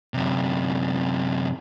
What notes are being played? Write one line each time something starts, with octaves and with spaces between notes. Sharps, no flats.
F#2 C3